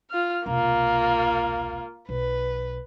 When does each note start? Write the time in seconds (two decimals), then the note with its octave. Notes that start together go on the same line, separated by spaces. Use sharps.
0.10 F4 F6
0.46 E1 C2 A#3 F4
2.09 B1 B4